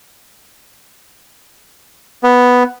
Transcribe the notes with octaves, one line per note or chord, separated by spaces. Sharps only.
B3